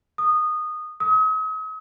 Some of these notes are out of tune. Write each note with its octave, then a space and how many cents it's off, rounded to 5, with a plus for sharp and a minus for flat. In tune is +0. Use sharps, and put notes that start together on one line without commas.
D#6 -15
D#6 +40